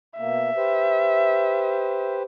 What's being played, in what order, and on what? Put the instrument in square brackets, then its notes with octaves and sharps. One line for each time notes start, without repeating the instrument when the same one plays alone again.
[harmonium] B2 A#3 [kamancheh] E5
[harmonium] G4 B4 C5